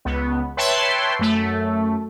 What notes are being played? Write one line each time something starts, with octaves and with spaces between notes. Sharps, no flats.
C#2 B3
B4 C#5 E5 G5 A5 C6
F#2 A3